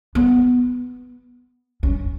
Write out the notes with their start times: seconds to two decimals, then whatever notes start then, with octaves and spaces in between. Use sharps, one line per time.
0.15 B3
1.83 C#4